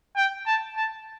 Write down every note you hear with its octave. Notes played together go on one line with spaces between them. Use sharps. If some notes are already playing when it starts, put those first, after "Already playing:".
G5
A5
A5